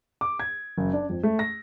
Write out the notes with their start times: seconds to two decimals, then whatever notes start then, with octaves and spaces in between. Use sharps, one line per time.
0.21 D6
0.40 G#6
0.77 F#1
0.93 D4
1.09 F2
1.23 A3
1.39 A#6